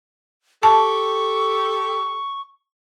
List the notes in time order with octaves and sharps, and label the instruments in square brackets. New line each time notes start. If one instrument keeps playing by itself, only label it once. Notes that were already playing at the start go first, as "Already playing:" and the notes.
[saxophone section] G4 A4 [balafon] A5 [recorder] C#6